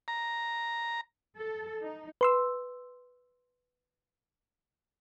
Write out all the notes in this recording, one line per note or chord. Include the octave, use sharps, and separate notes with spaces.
A#5
A4
D#4
B4 C6 E6